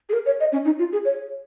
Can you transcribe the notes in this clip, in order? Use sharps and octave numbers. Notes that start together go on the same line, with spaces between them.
G#4
A#4
C#5
D#5
C#4
D#4
F4
G#4
C#5